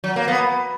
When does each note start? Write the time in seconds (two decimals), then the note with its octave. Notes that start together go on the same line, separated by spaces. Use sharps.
0.04 F#3
0.16 A#3
0.28 B3